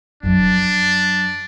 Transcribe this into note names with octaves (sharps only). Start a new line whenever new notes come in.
F#2 F#3 D4